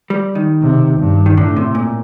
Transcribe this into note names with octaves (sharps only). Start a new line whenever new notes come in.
G3
D#3
C3
G2
D#3
A2 D3
C3
A#2